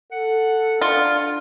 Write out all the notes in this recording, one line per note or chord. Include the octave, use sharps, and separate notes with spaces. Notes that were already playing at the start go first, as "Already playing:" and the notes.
A4 F#5
D4 F4